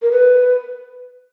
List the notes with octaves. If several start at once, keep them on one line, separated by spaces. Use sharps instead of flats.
A#4
B4